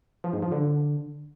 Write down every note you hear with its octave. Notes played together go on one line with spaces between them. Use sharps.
F3
G#2
F3
D3